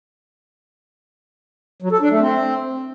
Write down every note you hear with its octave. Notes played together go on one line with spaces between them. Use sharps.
F#3
A4
D4
A3
C4